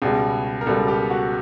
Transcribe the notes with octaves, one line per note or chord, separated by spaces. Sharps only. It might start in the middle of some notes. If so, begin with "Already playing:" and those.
C#2 B2 G3 G#4
A#4
C#2 B2 G3 A4
G4
F#4